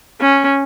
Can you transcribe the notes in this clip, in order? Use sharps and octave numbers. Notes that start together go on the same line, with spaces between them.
C#4